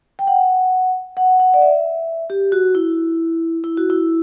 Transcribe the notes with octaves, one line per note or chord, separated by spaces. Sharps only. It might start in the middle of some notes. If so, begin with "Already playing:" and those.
G5
F#5
F#5
F#5
D5
E5
G4
F#4
E4
E4
F#4
E4